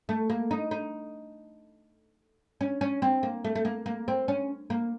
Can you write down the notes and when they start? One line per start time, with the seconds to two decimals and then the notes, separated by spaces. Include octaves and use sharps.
0.09 A3
0.30 A#3
0.51 D#4
0.71 D#4
2.61 C#4
2.81 C#4
3.02 C4
3.23 A#3
3.44 A3
3.55 A3
3.65 A#3
3.86 A#3
4.08 C4
4.28 C#4
4.70 A#3